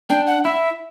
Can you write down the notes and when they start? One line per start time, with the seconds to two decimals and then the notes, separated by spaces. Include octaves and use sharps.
0.09 D4 G5
0.27 F#5
0.44 E4 E5